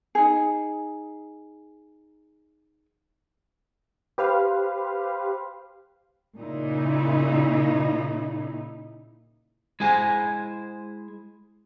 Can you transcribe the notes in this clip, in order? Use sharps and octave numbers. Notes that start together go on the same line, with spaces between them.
D#4 G#4
G4 B4 C5 F5
A#2 C#3 D#4 E4
G#3 E4 G#4 C5 G#5